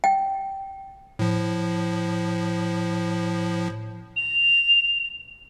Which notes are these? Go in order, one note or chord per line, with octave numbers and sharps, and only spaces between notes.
G5
A2 F3
F7